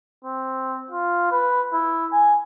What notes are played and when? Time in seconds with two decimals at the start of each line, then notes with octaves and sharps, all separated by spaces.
0.24 C4
0.91 F4
1.31 B4
1.73 E4
2.12 G#5